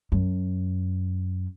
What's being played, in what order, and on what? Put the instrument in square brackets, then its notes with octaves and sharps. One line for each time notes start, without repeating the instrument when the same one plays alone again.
[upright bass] F#2